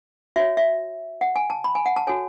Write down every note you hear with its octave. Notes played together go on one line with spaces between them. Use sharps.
F#4 C#5 E5
E5
F#5
G#5
A5
B5
G#5
F#5
A5
F#4 A4 C#5 G#5